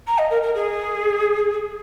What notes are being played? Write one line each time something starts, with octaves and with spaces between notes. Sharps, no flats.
A#5
D#5
A#4
A#4
G#4